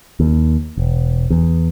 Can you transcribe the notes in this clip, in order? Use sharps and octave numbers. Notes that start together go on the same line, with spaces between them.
D#2
E1
E2